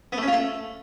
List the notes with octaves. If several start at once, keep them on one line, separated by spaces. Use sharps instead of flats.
B3
A3
C#4
F4
A3